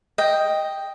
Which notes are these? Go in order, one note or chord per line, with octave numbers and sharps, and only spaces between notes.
D#5 G5